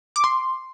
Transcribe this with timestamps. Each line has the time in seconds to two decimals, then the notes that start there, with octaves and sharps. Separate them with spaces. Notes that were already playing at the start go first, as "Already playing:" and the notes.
0.16 D6
0.24 C6